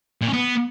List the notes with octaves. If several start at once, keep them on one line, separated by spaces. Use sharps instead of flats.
A#2
C#4
B3